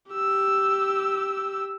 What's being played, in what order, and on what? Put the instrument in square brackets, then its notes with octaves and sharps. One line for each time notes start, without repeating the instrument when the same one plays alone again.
[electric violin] G4 E6